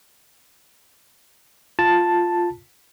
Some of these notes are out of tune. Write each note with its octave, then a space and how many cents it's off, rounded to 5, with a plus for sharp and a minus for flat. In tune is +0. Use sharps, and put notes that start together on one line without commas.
F4 +0 A5 +0